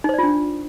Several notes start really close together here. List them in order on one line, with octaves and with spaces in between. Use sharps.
D#4 C5 D5 F4 D4